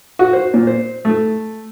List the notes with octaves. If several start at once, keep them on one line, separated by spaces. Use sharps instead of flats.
F#4
C5
A#2
C5
A3